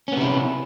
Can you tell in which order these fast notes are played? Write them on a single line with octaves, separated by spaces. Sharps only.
C#4 B3 C3 E4